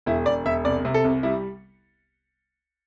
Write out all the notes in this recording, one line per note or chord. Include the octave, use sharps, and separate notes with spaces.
E1 E4
E1 D5
E1 E5
C2 D5
C3
A4
C2
G3 E4